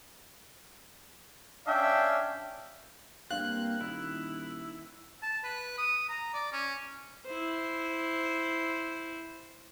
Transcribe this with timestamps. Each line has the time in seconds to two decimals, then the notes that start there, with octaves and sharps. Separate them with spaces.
1.67 C#4 D4 E5 F5 G5
3.31 G2 A#3 C4 F5 F#6
3.81 D#1 D#3 E4
5.22 A5
5.44 B4
5.78 D#6
6.09 A#5
6.34 D5
6.52 C#4
7.26 E4 C5